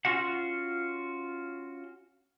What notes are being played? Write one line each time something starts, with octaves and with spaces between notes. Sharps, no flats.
C#4 F4 F#4 F#5